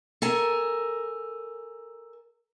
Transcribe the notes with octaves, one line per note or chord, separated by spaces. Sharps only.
A4 A#4 G#5